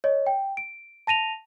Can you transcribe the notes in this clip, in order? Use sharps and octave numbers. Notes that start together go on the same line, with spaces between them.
C#5 D#5
G5
D7
A5 A#6 D#7 F7